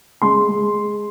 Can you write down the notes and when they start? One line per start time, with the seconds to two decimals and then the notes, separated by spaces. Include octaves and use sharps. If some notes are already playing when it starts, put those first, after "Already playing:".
0.22 G#3 C6
0.48 G#3